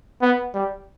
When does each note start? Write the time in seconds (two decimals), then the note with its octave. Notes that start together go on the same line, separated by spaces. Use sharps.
0.22 B3
0.54 G3